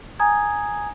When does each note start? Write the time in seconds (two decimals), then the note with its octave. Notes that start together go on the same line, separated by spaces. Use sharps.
0.20 G#5 A#5 D#6 G#6